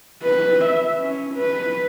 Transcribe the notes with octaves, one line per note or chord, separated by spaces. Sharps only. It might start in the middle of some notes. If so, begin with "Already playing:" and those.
B4
E5
C#4
B4